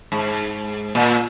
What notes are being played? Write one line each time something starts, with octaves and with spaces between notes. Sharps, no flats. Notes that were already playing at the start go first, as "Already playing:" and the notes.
G#2
A#2